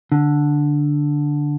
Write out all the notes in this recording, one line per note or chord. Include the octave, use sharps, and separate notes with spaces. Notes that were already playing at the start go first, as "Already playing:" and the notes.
D3